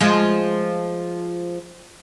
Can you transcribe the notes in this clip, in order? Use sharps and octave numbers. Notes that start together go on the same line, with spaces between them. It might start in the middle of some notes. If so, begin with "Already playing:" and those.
F3 G#3